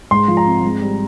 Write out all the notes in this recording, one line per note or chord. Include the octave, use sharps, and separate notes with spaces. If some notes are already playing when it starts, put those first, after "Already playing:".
G#2 C6
F3
A#5
C4
G#2
G3